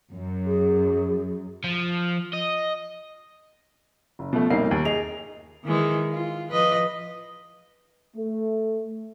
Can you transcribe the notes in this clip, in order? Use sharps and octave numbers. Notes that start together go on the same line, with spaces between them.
F#2
G#4
F3
D#5
F#1
B2 F3 A3
G1 C2 G3 A#3 D#4 C7
D#2
G#4 D#5 F7
D#3 E3 G#3
F4
F3 B4 D#5
A3